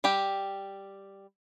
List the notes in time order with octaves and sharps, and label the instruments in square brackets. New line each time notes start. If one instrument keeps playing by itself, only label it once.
[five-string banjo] G3 G4